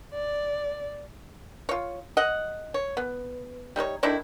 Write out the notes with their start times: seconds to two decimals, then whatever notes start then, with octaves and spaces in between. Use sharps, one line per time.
0.14 D5
1.69 F4 C#5
2.17 D#5 F#5
2.74 C#5
2.97 B3
3.76 G3 D#4 B4 C#5
4.03 D#3 A3 D4 E4